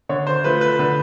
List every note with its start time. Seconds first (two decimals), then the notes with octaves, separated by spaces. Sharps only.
0.09 D3 C#5
0.27 C5
0.44 F3 A3 B4
0.61 B4
0.79 D3 B4